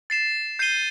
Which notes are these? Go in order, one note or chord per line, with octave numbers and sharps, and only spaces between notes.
A6 C7 E7
G6 C7 D#7 G7